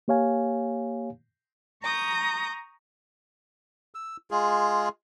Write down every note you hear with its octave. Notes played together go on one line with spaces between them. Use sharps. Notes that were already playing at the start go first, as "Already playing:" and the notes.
A#3 G4 C#5 F5 G#5
A#5 C#6 D#6 G6
E6
G#3 F4 G#4